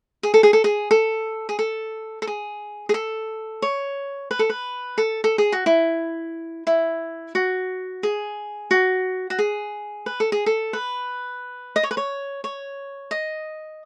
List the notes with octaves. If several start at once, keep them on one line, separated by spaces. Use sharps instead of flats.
G#4
A4
G#4
A4
G#4
A4
G#4
A4
A4
G#4
G#4
A4
C#5
B4
A4
B4
A4
A4
G#4
F#4
E4
E4
F#4
G#4
F#4
F#4
G#4
B4
A4
G#4
A4
B4
D#5
C#5
B4
C#5
C#5
D#5